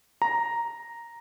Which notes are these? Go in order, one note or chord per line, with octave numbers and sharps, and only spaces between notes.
A#5